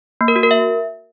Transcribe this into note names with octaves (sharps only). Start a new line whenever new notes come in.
A#3
A#4
F#4
A#4
E5